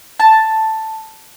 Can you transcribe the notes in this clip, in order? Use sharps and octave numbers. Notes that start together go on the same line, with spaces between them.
A5